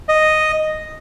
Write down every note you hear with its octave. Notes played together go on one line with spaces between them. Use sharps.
D#5